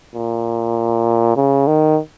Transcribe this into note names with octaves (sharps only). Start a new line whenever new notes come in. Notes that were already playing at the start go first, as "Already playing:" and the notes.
A#2
C#3
D#3